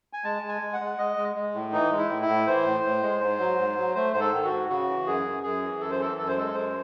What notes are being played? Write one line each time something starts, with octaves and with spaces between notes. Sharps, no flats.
G#5
G#3 A5
G#3
G#5
G#3
F#5
G#3
G#3 D#5
G#3
G#3
A2
E3 D#4
G#3
E4
A2
E4
A2
E3 C5
A2
A2
G#3
G#2
F#3
G#2
F#3
A3 C5
G#2 C5
A4
D#3
F#4
G#2
C#3 F#4
E3
F#2 G#4
F#2
F#2 G#4
E3
F#2 A4
C5
E3 A4
F#2 A4
C5
G#3 A4
F#2 C5